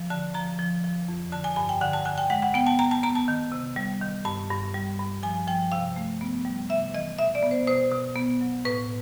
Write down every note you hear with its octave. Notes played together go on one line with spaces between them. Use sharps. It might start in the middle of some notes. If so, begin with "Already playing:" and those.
Already playing: F3
D3 A5
F3 A#5
F3
F3
F2
D3 A5
G#5
G2 G#5
G5
D3 F#5
A5
D3 G#5
G5
G#3 F#5
F#5
B3 G5
A5
B3 A#5
A5
B3 A#5
A5
D#3
C3
G3
D#3
G2 A5
G2
G3
G2
F3 G#5
F3 G5
C3 F5
A3
B3
G3
C3 E5
E3 D#5
B2 E5
D5
B3
C5
B2 C5
B2
B3
F#3
A2 B4